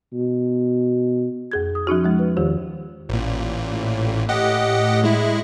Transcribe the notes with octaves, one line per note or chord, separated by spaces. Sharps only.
B2
F2 G#4 G#6
D#6
F3 C#4 D#4 F#4
F3 G#3
B4
E2 D#3 F4 G4 C5
A1 A#2
A2
G4 D#5 F#5
G#3 E4